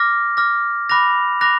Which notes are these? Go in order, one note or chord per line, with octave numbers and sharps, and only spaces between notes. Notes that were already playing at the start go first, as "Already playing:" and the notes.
Already playing: D6 F6 A#6
D6 F6 A#6
B5 D6 F#6 A#6 F7
B5 D6 F#6 A#6 F7